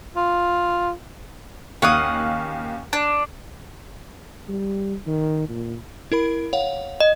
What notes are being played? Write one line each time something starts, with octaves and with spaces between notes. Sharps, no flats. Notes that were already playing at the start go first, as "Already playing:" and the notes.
F4
D#2 C#4 F5 F#5 D#6
D4
G3
D#3
A#2
E4 A#4 B5
C#5 F5 F#5
D#5